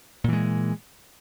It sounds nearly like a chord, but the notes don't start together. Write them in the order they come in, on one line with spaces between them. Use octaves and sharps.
A#2 E3 G#3